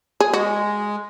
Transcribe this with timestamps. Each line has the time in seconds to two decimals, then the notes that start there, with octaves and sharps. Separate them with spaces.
0.20 G#4
0.33 G#3 F#4